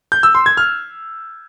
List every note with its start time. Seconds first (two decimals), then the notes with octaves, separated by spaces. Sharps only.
0.12 G6
0.23 E6
0.35 C6
0.46 G#6
0.57 F6